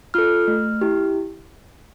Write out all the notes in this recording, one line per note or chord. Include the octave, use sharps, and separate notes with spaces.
F4 A4 F6
A3
E4 G4